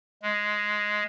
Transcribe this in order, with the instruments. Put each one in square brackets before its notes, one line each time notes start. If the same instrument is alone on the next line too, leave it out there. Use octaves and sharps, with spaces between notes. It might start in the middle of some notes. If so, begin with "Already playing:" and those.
[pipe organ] G#3